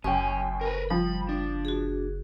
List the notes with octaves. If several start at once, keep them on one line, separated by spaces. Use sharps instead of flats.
F#1 F#2 C#4 G5 C#6
A#4 B4
F3 G3 B5
D4
F#4 G#4